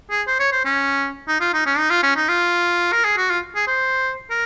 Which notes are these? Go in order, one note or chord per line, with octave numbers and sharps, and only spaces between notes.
G#4
C5
C#5
C5
C#4
D#4
F4
D#4
C#4
D#4
F4
C#4
D#4
F4
A#4
G#4
F#4
F4
G#4
C5
A#4